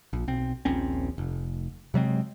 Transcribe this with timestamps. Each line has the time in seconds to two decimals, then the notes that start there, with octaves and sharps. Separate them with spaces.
0.13 A#1
0.28 B1 C4
0.65 D#1 A#1 C4 C#4
1.18 F1
1.94 C3 F#3 G#3 C4